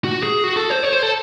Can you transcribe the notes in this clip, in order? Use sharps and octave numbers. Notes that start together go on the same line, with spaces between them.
F#4
G#4
F#4
A4
C5
C#5
C5
A4